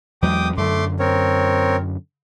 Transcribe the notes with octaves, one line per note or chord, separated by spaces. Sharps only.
E2 F#3 G#3 G5 D6 D#6
F#2 D3 A3 C6 D6
C4 A#4 C#5